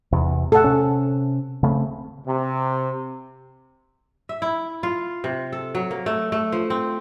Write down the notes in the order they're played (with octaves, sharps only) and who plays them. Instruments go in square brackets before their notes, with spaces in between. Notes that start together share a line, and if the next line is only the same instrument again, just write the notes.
[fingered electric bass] E2 C3
[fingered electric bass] A2 [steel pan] A4 F#5
[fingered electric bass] C3 C#4
C#3 A3 C4
[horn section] C3
[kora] E5
E4
F4
C3
A4
F#3
A#3
A3
A3
F3
C4